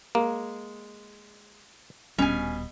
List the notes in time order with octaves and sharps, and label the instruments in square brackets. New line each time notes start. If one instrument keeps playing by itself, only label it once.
[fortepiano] G#3 [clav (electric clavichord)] A#3
[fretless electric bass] D#1 C2 G3 [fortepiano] B2 [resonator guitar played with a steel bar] C#4 G#5